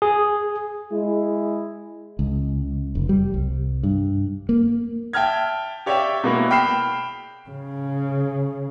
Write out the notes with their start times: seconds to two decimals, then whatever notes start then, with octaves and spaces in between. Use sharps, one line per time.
0.02 G#4
0.92 G#3 E4
2.19 C#2
2.95 F1
3.09 G3
3.34 C2
3.83 G2
4.49 A#3
5.13 E5 G5 A5 F6 G#6
5.86 G4 C#5 D5 E5 F5 G5
6.24 B2 G#3 A#3 B3 E4
6.51 G5 B5 F6 C7 E7
7.50 C#3